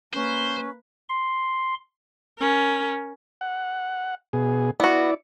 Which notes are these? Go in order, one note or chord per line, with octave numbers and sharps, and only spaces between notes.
A#3 C#4 B4 C5
C6
C#4 A#4
F#5
B2 G#4
B3 E4 F#4 D5